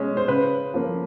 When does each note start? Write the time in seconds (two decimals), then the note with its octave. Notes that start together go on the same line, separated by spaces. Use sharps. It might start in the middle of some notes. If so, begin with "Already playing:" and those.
Already playing: B2 G#3 C#4
0.17 C5
0.28 C#3 B4
0.74 F3 A#3